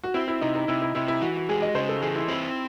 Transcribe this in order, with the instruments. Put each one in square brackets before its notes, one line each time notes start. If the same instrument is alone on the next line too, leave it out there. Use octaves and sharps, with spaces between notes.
[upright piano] F#4
[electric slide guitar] C4 [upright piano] E4
[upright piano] E4
[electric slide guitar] C3 [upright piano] D#4
[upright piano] D#4
[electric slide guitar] C3 [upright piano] E4
[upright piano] E4
[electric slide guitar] C3 [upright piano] E4
[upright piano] E4
[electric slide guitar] E3 [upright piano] F#4
[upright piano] F#4
[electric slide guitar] G#3 [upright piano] G#4
[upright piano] D#5
[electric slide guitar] C#3 [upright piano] C5
[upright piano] A4
[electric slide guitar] E3 [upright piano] G#4
[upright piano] E4
[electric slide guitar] C4 [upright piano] E4